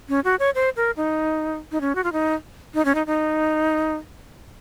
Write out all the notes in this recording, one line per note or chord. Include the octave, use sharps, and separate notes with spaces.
C#4
F#4
C#5
C5
A#4
D#4
D#4
C#4
F#4
F4
D#4
D#4
C#4
D#4
D#4